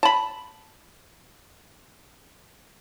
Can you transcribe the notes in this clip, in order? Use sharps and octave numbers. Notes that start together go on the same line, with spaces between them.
A5 B5